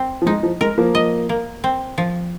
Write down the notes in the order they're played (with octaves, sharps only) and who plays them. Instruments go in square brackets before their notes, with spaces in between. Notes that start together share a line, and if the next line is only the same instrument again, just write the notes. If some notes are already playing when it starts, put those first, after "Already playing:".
Already playing: [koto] C4
[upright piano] F3
[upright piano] G#3 [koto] D#4
[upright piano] F3
[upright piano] G#3 [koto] A#4
[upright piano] F3 A#3
[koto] D#5
A#3
C4
F3